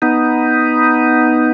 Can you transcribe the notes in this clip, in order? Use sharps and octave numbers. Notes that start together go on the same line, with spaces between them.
B3 D#4